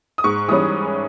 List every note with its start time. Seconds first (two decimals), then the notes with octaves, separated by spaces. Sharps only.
0.18 D#6
0.24 G#2 C#6
0.48 E3 G3 C#4 D#6